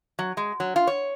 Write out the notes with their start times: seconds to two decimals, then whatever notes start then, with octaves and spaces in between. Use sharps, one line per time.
0.19 F#3
0.37 G#3
0.60 F#3
0.76 F4
0.87 C#5